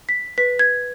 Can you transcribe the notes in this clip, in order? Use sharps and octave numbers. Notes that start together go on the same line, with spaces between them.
B6
B4 B6
G#6